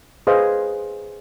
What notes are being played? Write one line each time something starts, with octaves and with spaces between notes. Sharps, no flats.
G#4 B4 C5 D#5 F5